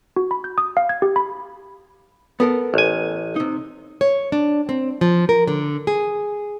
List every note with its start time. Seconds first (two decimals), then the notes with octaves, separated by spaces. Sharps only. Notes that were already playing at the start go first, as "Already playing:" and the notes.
0.16 F#4
0.31 B5
0.44 G6
0.58 D#6
0.77 F5
0.89 G#6
1.02 G4
1.16 B5
2.40 B3 A4 A#4
2.74 A1 G#5
3.36 C3 D#4
4.01 C#5
4.32 D4
4.69 C4
5.01 F3
5.29 A#4
5.47 D3
5.87 G#4